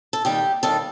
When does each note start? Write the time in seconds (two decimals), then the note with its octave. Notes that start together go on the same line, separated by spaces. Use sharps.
0.13 A4
0.25 D#2 D#3 G3 G4
0.63 D#2 D#3 G3 A4